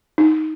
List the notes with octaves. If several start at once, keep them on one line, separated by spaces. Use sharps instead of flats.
D#4